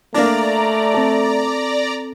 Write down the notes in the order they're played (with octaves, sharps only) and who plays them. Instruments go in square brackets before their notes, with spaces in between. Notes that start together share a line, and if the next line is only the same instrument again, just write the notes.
[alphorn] A3 [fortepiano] A#3 D4 [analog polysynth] D5 A#5
[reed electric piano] C4 A4